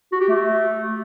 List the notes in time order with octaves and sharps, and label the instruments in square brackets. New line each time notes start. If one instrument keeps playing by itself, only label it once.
[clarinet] F#4
G4
A3